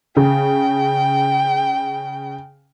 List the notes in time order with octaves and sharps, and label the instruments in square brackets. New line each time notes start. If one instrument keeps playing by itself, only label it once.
[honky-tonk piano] C#3 [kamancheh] G5